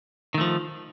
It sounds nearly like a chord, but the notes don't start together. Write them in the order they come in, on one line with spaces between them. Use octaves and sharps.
D#3 A3 F3